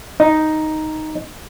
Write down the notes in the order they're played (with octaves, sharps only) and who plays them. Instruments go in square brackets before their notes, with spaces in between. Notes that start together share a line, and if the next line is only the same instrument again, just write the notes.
[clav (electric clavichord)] D#4